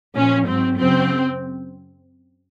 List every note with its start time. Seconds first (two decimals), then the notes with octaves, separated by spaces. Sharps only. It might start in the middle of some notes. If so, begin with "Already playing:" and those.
0.16 A#2 F3 C#4
0.47 G#2 F#3 C4
0.78 F#2 C#3 F#3 C4